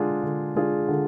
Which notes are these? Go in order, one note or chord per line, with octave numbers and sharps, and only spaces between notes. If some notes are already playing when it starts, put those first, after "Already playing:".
Already playing: D3 G#3 D4 F4 G#4
D3
G#3 D4 F4 G#4
D3